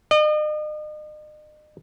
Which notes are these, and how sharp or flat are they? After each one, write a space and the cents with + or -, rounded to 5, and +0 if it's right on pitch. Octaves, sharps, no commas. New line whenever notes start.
D#5 -40